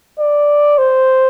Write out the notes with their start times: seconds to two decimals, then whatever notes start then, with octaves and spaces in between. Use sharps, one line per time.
0.19 D5
0.78 C5